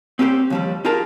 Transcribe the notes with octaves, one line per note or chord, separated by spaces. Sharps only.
C4 C#4 G4 B4 C5
D#2 F3 G3
D#4 F4 G4 G#4 A#4 A5